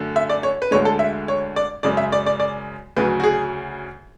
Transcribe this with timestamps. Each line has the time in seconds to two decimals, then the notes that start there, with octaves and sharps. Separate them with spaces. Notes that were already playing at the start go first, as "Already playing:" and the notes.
Already playing: F#2 D3 A3
0.16 E5
0.30 D5
0.43 C#5
0.62 B4
0.71 D2 D3 G#3 C#5
0.85 A4
0.99 E5
1.28 C#5
1.56 D5
1.83 F#2 C#3 G#3 D5
1.97 E5
2.12 D5
2.26 D5
2.40 D5
2.96 D2 C#3 F#3 B4
3.20 F#4
3.24 G#4